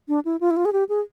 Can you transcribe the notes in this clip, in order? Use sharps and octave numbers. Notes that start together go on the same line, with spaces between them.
D4
E4
F4
E4
F4
G#4
G4
G#4